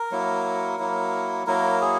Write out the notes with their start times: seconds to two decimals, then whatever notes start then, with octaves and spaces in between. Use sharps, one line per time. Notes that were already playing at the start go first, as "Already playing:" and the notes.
Already playing: A#4
0.12 F#3 A#3 E4
0.79 F#3 A#3 E4
1.47 F#3 A#3 E4 A#4
1.81 G#4